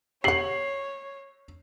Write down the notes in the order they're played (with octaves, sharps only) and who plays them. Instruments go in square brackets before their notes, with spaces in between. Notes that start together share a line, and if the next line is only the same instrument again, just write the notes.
[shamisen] G4 F#5 [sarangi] C#5 [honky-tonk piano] C7 F#7